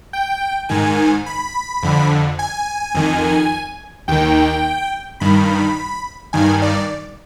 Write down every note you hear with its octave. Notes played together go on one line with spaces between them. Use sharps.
G5
G#2 D#3 G#5
B5
F2 D3
G#5
F2 D#3
D#2 D#3 G5
G2 D#3 B5
G2 D#3 G#5
D5